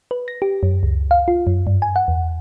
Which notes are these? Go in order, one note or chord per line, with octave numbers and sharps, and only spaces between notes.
B4
A#6
G4
F#2
C#2
F5
F4
F#2
G2
G#5
F#5
E2